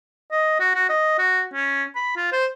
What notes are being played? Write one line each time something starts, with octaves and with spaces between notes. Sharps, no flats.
D#5
F#4
F#4
D#5
F#4
C#4
B5
F4
C5